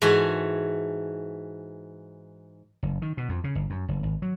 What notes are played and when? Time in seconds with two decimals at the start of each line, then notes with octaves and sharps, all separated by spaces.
0.02 G#2 E3 F#4 A4 F#5 G#5
2.83 F#1
3.02 D#3
3.17 B2
3.29 F2
3.44 C#3
3.55 G1
3.70 F#2
3.89 F#1
4.03 G#1
4.22 F#3